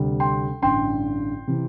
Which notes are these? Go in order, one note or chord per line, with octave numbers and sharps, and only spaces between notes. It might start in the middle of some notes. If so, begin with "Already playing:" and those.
Already playing: D2 C3 G3
G5 C6
A1 G2 D3 G5 C6
C3 E3